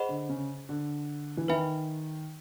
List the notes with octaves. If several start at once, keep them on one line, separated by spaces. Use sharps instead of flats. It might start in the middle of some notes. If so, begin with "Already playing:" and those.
Already playing: G#4 C5 D#5 F#5 B5
D3
C#3
D3
E3
D#3 B4 E5 G#5 B5